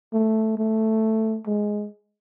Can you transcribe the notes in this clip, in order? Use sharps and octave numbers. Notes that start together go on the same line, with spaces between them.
A3
A3
G#3